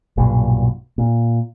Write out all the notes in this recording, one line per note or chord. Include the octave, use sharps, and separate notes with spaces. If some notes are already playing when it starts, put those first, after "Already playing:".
B1 G2 A#2
A#2